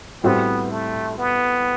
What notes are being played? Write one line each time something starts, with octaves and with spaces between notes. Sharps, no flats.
A2 G3 B3 C4 F#4 C5
A3
B3